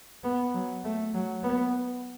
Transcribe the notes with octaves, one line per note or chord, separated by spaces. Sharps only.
B3
F#3
A3
F#3
B3